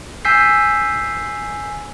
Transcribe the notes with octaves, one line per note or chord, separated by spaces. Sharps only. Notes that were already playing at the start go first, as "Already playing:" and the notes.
G#5 E6 G6 B6 C7